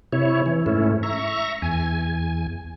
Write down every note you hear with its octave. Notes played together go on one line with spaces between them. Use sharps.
C3 E4 C#5
E3
G#2 A3 C#4 E4
E5 A#5 C#6
E2 G#5